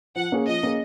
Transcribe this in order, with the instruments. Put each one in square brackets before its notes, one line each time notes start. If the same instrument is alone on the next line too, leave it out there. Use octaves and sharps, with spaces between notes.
[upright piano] F3 [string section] F#5
[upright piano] A#3 C#4 G#4
[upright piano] F3 [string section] D#5
[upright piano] A#3 C#4 G#4